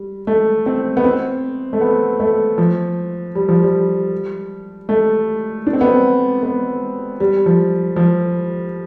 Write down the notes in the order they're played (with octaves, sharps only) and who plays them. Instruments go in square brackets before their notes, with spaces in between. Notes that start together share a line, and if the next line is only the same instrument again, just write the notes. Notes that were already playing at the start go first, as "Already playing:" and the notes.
Already playing: [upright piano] G3
A3
C4
B3
C4
A3
B3
A3
F3
G3
F3
G3
A3
D4
C4
B3
C4
B3
G3
F3
F3